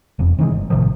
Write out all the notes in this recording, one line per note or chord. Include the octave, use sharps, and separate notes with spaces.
E1 F2
C3 D#3 E3 G#3
G1
A1 C3 D#3 F3